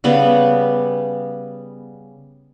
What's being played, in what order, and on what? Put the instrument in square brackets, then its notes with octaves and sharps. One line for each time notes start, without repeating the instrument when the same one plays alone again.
[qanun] C#3 G3 B3 B4